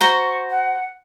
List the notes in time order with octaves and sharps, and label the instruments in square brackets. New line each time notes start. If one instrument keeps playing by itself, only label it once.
[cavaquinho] F#4 C5 A#5 [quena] C#6
[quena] F#5